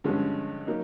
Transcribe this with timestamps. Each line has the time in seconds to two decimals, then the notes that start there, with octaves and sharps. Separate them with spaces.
0.04 G2 D3 F3 G#3 C#4
0.67 F#3 A#3 D#4